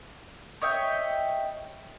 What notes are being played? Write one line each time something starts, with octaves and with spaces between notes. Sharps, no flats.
C#5 D#5 E5 G5